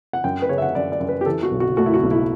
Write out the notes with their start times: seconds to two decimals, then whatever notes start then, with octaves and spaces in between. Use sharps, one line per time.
0.13 F#5
0.24 F#2 G5
0.42 B4
0.49 C#3 C#5
0.58 E5
0.62 F#5
0.75 F#2 D5
0.92 D5
1.00 F#2
1.09 B4
1.21 G4
1.26 E3 A4
1.43 F#4
1.51 B1
1.60 F#4
1.77 A3 F#4
1.86 E4
1.94 F#4
2.03 B1
2.11 E4